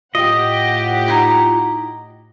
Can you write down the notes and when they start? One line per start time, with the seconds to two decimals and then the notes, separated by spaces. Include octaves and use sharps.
0.15 A2 F4 G4 D#5 F#5
1.08 D#4 E4